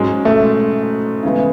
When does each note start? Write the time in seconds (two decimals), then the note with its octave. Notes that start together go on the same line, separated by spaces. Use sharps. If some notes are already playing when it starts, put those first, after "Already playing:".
Already playing: G#2 F#3 G#3 C#4
0.25 A3
1.23 C#3 E3 G#3 B3